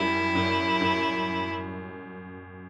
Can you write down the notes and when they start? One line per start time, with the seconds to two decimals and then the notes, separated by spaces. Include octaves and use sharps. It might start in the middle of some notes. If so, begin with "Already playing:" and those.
Already playing: F#2 G3 E4
0.35 F#2
0.81 F#2